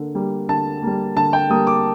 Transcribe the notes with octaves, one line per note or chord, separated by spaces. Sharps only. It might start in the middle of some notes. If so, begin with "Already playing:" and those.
Already playing: D3 A#3
G3 A#3
D3 A5
G3 A#3
D3 A5
G5
G3 A#3 D#6
D6